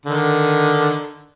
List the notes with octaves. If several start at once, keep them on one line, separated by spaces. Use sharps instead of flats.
D3 D#3